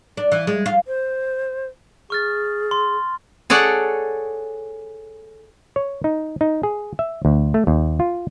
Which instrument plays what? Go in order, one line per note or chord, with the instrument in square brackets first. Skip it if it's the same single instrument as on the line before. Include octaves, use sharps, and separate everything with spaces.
[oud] D4
E3
G#3
F4
[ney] C5
[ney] G#4 [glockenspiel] C#6 F6 A6
[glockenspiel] C6
[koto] G#4 A4 C#5 D5 F#5
[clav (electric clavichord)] C#5
D#4
D#4
G#4
E5
D2
A3
D#2
F4